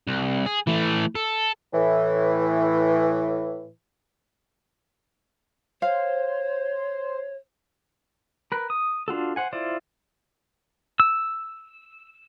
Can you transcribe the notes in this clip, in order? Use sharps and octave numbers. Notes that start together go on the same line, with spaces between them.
C2
G#4
E3 A3
A4
A2 E3
C5 C#5 F5
A#4 B4
D#6
D4 F4 F#4 A4
C5 F#5 G#5
E4 F4 C5 D5
E6